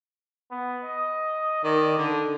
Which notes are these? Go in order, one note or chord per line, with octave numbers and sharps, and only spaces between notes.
B3
D#5
D#3 D5
D3 D4